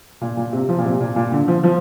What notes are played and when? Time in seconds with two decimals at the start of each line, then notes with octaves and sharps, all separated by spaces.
0.21 A#2
0.37 A#2
0.53 C3
0.69 F3
0.78 A#2
0.84 C3
1.00 A#2
1.16 A#2
1.32 D3
1.48 F3
1.64 F3